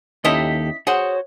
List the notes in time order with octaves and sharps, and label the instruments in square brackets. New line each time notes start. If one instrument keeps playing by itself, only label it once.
[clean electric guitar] D#2 G4 A4 [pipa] C#4 E4 D#5 [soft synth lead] B6
[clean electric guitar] F#4 C5 [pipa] G#4 F#5 [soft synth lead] C#5